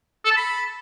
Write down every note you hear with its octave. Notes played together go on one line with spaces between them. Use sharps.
A4
A5
B5